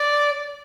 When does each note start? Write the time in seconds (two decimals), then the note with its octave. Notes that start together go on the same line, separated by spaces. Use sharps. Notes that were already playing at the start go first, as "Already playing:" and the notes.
Already playing: D5